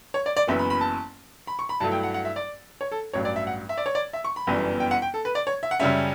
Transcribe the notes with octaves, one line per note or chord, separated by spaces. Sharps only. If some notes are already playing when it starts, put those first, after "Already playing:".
C#5
D5
D5
F#1 F#2 E3 B3 E5
B5
B5
A5
B5
C#6
B5
G2 F#3 A3 E4 A5
G5
F#5
F#5
E5
D5
C#5
A4
A1 G2 F#3 C#5
D5
E5
F#5
E5
D5
C#5
D5
E5
C#6
B5
G1 F#2 E3 G3 B3
G5
F#5
G5
A4
B4
D5
C#5
E5
F#5
F#2 C#3 G3 C#4 E5